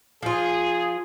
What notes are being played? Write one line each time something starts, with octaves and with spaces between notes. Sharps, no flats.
F3 F4 G#4